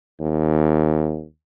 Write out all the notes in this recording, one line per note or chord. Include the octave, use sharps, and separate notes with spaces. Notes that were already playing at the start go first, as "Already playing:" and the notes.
D#2